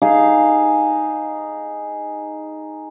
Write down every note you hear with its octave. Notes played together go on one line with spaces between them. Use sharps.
D#4 G#4 F5